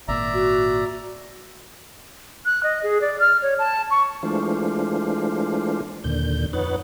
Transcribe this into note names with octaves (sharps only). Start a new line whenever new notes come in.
G#1 A#2 D5 E5 A#5
F#4
F#6
D#5
G#4
D5
F6
C#5
A5
C#6
E3 G#3 A3 D4 F4 C5
D#2 A#2 D3 G6
F2 D#4 B4 C#5 F#5 A6